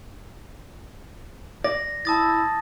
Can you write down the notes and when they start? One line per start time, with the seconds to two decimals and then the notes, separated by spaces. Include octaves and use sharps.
1.64 D5 A#6
2.05 E4 A5 D#6 A6